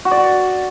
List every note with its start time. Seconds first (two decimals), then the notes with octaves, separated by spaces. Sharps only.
0.05 F#4
0.11 D5
0.17 F#4